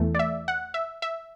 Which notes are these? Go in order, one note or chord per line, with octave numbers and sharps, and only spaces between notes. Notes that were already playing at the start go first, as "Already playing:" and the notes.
Already playing: E2 E3 A3
D5
E5
F#5
E5
E5